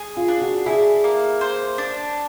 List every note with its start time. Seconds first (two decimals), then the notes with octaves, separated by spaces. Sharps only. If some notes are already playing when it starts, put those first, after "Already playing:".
Already playing: G#4
0.17 F4
0.28 D4
0.41 F#4
0.66 E4 G#4
1.04 A#3
1.41 C5
1.78 D4